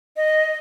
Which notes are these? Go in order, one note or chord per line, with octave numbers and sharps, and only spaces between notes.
D#5